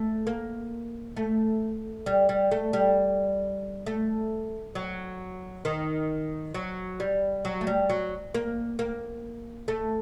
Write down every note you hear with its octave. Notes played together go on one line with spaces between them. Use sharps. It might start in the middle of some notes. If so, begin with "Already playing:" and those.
Already playing: A3
A#3
A3
G3
G3
A3
G3
A3
F#3
D#3
F#3
G3
F#3
A3
G3
F#3
A#3
A#3
A3